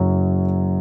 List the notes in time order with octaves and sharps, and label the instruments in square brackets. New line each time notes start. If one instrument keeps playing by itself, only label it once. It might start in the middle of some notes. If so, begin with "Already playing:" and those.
Already playing: [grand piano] F#1 F#2 F#3